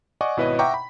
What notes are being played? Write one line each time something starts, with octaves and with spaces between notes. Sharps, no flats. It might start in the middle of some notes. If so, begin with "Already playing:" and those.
D5 D#5 F#5 G#5 C#6 D6
G#1 B2 E4 B4 C#5 D#5
E5 F#5 G5 A#5 C#6 D6
B5